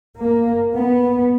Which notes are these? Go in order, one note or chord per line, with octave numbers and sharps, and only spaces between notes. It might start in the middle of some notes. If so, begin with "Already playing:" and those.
A#3
B3